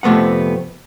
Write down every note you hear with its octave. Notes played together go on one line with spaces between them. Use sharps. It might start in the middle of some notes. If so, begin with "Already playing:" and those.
F2 C3 A3 B3 F#5